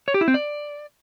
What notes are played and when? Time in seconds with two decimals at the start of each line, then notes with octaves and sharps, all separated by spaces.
0.08 C#5
0.14 G4
0.21 E4
0.28 C4
0.34 D5